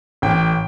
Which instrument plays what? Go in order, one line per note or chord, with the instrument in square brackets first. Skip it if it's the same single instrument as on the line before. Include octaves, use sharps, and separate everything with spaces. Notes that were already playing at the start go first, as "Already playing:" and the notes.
[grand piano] A1 G5